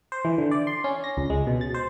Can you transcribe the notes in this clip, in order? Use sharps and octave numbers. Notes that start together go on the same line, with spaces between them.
C5
E3
D3
D5
C6
C#4
A#6
C#2
G#3
B2
A6
C5